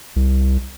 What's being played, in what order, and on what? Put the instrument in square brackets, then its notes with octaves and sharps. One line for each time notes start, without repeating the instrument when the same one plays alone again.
[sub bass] C2